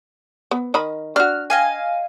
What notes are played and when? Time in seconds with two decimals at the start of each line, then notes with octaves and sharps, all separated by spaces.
0.51 B3
0.74 D#3 D#5 B5
1.16 D4 F#4 F6
1.50 D#5 F5 G#5